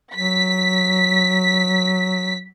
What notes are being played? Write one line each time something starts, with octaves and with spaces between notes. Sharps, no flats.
F#3 B6